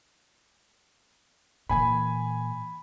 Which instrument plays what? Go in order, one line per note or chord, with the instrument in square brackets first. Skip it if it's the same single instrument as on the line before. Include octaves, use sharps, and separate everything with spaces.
[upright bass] A#2 E3 [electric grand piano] G#5 B5